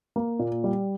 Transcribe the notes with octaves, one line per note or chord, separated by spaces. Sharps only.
A#3
A#2
G3